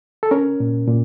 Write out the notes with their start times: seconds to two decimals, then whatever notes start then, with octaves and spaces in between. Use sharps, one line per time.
0.23 A4
0.31 C#4 A#4
0.60 A#2
0.87 A#2